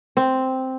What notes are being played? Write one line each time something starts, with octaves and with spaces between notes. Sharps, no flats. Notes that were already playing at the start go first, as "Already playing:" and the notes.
C4